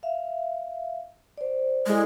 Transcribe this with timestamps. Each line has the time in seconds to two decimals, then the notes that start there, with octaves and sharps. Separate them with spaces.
0.03 E5 F5
1.38 C5 D5
1.86 G#3 E4 A4 D5